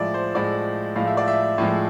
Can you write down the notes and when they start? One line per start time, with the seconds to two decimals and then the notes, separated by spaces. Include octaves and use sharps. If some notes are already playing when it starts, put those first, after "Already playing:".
Already playing: A2 F3 G#3 D5 E5
0.14 C5
0.35 A2 F3 G#3 D5
0.96 A2 F3 G#3 F5
1.07 E5
1.17 D5
1.28 E5
1.58 A2 F3 G#3